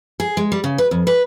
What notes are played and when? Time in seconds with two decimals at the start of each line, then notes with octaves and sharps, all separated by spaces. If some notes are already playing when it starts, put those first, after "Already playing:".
0.20 G#4
0.37 G#3
0.52 G3
0.64 C#3
0.78 B4
0.91 F2
1.07 B4